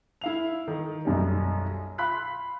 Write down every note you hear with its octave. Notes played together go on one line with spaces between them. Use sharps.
E4 F5 F7
D#3
B1 F#2 G3
F5 B5 C6 F#6 B6